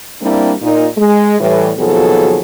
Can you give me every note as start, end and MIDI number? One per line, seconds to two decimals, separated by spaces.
0.23 0.54 55
0.23 0.54 58
0.23 0.54 60
0.23 0.54 62
0.23 0.54 64
0.23 0.54 67
0.62 0.89 46
0.62 0.89 63
0.98 1.38 56
1.40 1.71 45
1.40 1.71 52
1.40 1.71 55
1.78 2.41 39
1.78 2.41 47
1.78 2.41 53
1.78 2.41 54
1.78 2.41 68
1.78 2.41 69